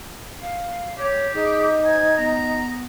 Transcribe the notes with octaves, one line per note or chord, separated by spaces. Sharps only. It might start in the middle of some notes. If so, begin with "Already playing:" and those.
F5
G4 C#5
D#4 G#4
C5 G#5
B3 A#5